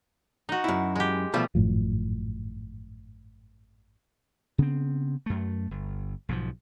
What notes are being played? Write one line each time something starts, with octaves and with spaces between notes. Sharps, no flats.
D#4 F#4
F#2 E4
G#3 G4
B2 F3 G3 A3
G#1 F#2 A2 F3
C#3 B3 C4
F#2 A3
G1
B1 G#2 C#3 F3